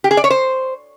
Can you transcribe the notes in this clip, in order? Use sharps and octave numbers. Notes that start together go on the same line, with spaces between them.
G4
G#4
D5
C#5
C5